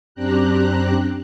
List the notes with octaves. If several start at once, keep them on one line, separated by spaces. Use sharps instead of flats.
F#2 C4 D4 G4 A#5 F#6